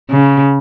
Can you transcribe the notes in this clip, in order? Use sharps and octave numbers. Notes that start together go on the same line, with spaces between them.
C#3